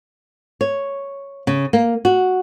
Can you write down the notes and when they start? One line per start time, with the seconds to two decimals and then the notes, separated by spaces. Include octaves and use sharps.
0.61 C#5
1.47 C#3
1.73 A#3
2.05 F#4